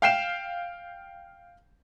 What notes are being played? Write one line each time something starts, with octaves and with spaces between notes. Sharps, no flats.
F5 G5 C7 E7